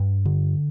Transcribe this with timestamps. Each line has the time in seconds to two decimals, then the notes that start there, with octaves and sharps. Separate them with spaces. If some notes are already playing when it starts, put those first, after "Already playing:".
Already playing: G2
0.25 D3